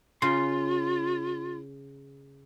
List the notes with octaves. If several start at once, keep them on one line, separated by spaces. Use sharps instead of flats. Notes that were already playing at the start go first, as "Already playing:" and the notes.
C#3 F4 C6